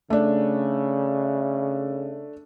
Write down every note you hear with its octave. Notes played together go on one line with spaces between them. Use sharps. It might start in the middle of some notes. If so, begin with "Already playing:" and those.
C#3 A3 D4